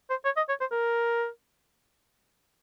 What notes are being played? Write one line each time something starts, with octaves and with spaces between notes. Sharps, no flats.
C5
C#5
D#5
C#5
C5
A#4